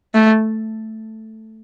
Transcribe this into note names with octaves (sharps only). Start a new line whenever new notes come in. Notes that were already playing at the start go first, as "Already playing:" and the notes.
A3